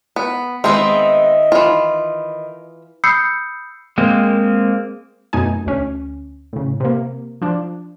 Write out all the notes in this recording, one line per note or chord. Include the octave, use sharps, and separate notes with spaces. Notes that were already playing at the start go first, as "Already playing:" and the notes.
B3
D#3 G#3 B3 C4 E5
E3 F4
B5 D#6 E6 G6 C7 C#7
G#3 A#3 C4
F#2 B2 A3 D#4 G#5
D2 C#4
A2 C#3
C3 A#3
F3 D4